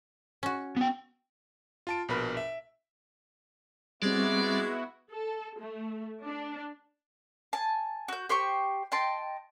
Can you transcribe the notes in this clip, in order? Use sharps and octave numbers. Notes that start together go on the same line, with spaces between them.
C#4 F#4
B3 G5
F4 A5 D7
A#1 B2 A#4 B4 B5
E5
G3 G#3 B3 C4 E4 F#4 D5
A4
A3
D4
G#5 A5
F#4 G6
G4 C5 G5 C#6
D#5 G5 A5 C6